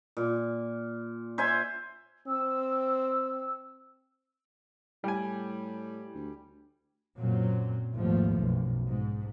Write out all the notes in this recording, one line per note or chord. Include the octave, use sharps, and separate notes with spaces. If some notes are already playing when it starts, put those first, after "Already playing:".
A#2
C5 E5 G#5 C6
C4 E6
A2 G3 G#5
D2
F#2 A#2 F#3 C4
G#1 D#2 F3 A3 B3
B1 F#2
G#2